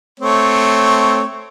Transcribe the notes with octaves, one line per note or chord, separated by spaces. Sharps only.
A3 C4 C#5